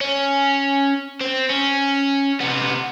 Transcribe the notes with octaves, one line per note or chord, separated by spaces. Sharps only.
C#4
C4
C#4
C3 B3